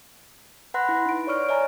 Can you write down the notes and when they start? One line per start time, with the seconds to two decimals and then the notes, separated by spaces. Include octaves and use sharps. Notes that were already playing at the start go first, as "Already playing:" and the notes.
0.74 B4 F#5 B5 C6 F#6 A#6
0.89 E4
1.06 D#4 D7
1.27 C#5 D5 C#6 F6 D7
1.49 C#5 D#5 G#5 A#5